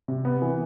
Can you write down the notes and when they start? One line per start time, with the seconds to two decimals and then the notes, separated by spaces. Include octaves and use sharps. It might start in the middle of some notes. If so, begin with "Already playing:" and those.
0.08 C3
0.25 B3
0.42 E3